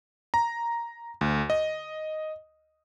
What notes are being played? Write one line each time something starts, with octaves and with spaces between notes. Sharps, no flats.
A#5
D2
D#5